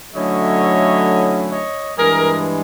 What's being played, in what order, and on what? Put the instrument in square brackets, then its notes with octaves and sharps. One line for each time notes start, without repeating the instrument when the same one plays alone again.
[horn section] D3 F#3 A3 C#4 E4 C#5 D#5
C#5 D#5
G2 E3 G#3 G#4 A#4